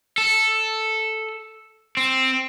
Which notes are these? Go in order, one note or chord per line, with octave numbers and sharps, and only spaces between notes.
A4
C4